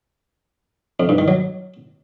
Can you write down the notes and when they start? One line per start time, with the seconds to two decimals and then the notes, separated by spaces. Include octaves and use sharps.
1.00 F2
1.09 G2
1.18 D#3
1.28 F#3